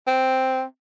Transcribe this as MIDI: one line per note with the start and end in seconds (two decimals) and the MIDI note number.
0.07 0.63 60